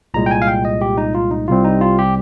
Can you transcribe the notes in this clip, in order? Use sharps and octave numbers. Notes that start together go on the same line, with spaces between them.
C2 A#2 G#3 A#5
G5
G#5
F5
G5
D#5
G4
D#4
F4
D#4
C2 C3 G3 C4 F4
D#4
F4
G4